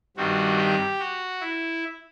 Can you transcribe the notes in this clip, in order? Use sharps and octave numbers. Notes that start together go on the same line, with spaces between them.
G2 D#3 G3 C4 F#4
G4
F#4
E4